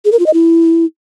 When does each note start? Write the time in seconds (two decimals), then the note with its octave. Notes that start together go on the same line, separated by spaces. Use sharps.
0.05 G#4
0.12 A#4
0.19 F4
0.26 D#5
0.34 E4